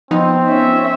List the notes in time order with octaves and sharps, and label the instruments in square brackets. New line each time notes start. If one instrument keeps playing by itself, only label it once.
[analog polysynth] F3 B3 D#4 [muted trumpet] C4
[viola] C#4 E5